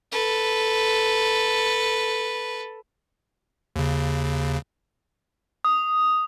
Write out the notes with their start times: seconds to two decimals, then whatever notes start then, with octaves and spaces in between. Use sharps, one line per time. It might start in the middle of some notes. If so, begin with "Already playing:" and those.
0.12 A4 B4
3.76 D#2 C#3
5.65 D#6